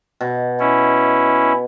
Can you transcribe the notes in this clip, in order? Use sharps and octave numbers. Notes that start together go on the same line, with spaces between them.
B2
C#4 E4